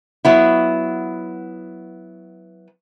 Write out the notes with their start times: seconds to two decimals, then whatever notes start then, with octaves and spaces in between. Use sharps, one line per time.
0.25 F#3 B3 E4